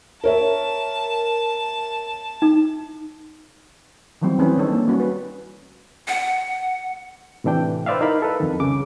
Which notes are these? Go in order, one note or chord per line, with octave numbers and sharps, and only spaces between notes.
A#4 C#5 E5 A5
D#4
D#3 E3 F#3 G3 C4
E3 C4 C#4 E4 G#4 B4
D#3 D4 D#4 A4 C#5
A#3
G3 C#4 F#4
B4
F#5
A2 C3 E3 D4 G5
B4 C5 D5 E5 F5
D#4 E4 A#4 F5 B5
A4 B4
F2 D#3
C2 C#3 D6